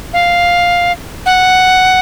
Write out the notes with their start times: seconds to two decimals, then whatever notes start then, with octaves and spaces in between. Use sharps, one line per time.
0.13 F5
1.26 F#5